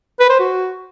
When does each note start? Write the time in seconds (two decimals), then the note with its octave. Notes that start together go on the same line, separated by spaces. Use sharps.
0.20 B4
0.30 C5
0.39 F#4